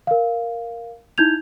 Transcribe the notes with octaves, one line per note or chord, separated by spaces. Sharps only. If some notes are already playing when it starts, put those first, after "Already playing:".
A#4 F5
D#4 E4 G6 G#6 F7